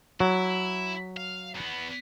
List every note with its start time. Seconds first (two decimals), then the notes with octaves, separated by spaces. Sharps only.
0.20 F#3 E4
1.17 F5
1.55 E2 B3